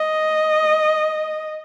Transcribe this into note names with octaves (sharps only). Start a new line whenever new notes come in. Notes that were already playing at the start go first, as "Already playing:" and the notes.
Already playing: D#5